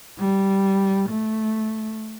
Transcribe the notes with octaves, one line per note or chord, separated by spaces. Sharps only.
G3
A3